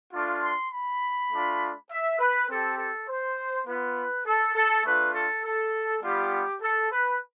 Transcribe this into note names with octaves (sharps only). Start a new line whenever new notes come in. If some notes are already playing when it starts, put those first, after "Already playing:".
A3 D4 F4
C6
B5
A3 D4 F4
E5
B4
C4 G4 A4
A4
C5
B3 F4 B4
A4
A4
A3 D4 F4 B4
A4
A4
G3 B3 F4 G4
A4
B4